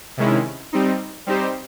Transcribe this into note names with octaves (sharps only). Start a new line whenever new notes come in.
C3 D#3 G#3 C#4 E4
G3 C4 D#4
G3 C4 D#4 G4 C5